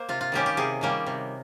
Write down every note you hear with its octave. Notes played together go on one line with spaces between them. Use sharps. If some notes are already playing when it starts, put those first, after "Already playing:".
Already playing: A#3 C5
C3 F4
F4
D#3 G3 A#3 C#4 G4
G4
C3 G#4
D#3 G3 A#3 C#4
C3